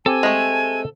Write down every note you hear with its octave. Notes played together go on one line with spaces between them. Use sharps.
C4 G4 A4 G#5
G#3 A3